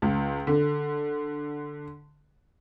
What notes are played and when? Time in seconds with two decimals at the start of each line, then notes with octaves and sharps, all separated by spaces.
0.02 C#2
0.47 D3